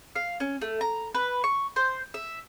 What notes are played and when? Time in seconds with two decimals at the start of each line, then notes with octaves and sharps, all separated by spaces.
0.16 F5
0.40 C#4
0.61 A3
0.81 A#5
1.15 B4
1.44 C#6
1.76 C5
2.14 E5